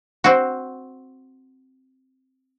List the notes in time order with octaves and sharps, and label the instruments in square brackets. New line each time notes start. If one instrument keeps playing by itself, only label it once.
[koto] C4 F#4